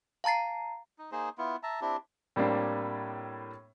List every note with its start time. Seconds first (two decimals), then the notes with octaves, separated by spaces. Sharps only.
0.24 F5 A5 A#5 A6 C7
0.99 D#4
1.12 A#3 D#4 G#4 C5
1.38 B3 E4 F4
1.63 E5 A5 A#5
1.81 C4 D4 E4 G4
2.36 A2 G3 A#3 C4 D4